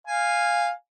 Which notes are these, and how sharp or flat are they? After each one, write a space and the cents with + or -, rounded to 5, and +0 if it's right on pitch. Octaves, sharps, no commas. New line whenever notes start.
F5 +0 G#5 -15